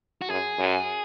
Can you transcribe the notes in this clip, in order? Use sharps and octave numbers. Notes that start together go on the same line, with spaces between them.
F#4
F#2 G#4
F#2